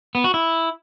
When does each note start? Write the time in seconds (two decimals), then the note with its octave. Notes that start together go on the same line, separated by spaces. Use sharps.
0.15 B3
0.24 F#4
0.34 E4